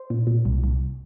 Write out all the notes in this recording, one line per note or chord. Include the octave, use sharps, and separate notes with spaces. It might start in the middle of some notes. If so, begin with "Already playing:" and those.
Already playing: C5
A#2
A#2
C2
C2